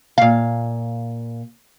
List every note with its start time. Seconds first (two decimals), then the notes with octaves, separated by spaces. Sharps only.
0.18 A#2 F5